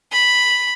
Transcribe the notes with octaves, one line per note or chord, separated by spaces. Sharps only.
B5